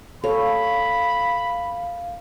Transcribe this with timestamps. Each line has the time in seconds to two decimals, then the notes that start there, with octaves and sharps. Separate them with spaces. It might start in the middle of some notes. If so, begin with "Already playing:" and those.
0.24 A4 C#5 F5 B5